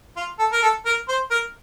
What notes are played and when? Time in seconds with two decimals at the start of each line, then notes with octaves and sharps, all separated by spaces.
0.17 F4
0.39 A4
0.52 A#4
0.63 A4
0.86 A#4
1.09 C5
1.31 A#4